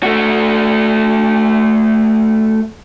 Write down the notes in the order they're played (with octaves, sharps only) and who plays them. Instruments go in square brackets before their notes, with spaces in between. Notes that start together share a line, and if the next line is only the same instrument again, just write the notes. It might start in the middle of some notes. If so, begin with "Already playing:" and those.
[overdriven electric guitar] A3 F#4